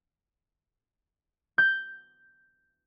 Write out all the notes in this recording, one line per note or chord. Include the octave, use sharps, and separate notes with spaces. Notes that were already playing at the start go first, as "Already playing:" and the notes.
G6